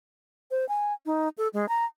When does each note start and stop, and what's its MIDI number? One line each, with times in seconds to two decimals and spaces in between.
0.51 0.68 72
0.69 0.93 80
1.06 1.29 63
1.38 1.48 69
1.53 1.68 56
1.69 1.85 82